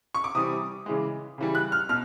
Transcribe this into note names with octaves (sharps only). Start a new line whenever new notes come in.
C#6
D6
C3 E3 G3 D#6
C#3 E3 G#3
C#3 E3 G3
F#6
F6
B2 F6